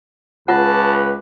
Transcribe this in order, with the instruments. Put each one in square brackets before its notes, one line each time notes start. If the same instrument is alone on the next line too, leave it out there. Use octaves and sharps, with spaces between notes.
[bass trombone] C#2 [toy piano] F4 F#5 [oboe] B4 [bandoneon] A5